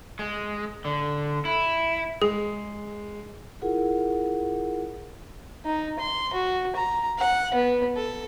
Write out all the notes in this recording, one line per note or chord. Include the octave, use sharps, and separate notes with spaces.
G#3
D3
E4
G#3 G#4
E4 F4 G#4 A#4 F#5
D#4
C6
F#4
A#5
F#5
B3
A4